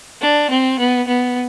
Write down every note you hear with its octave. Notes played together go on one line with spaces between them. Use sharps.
D4
C4
B3
B3